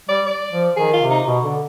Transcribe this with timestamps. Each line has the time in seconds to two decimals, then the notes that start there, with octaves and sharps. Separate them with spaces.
0.09 G3 D5
0.26 D5
0.51 F3
0.77 D#3 G#4
0.93 F4
1.02 C3
1.10 D#4
1.27 B2
1.44 D3